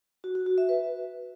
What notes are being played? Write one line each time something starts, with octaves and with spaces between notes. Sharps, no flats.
F#4
F#4
F#4
E5
B4